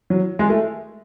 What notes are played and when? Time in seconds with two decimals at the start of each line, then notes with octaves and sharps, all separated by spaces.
0.10 F#3
0.39 G#3
0.49 A3